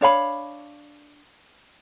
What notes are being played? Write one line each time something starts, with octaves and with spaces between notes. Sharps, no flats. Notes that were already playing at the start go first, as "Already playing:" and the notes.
D4 C#5 F5 B5